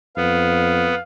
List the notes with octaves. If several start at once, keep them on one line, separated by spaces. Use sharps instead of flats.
F2 B3 F5